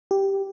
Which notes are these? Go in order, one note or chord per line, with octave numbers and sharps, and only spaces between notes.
G4